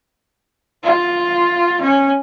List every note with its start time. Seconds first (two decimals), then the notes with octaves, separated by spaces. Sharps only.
0.83 F4
1.81 C#4